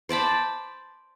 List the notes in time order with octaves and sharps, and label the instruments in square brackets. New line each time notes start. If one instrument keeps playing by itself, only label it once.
[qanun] C5 D5 A5 B5